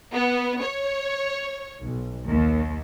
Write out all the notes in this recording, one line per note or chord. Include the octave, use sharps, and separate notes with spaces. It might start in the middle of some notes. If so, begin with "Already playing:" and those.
B3
C#5
B1
D#2